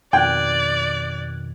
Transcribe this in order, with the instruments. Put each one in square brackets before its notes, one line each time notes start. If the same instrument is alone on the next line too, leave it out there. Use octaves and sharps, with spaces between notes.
[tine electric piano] F2 B2 D#3 [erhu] D5 [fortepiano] G5 [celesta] F#6 G#6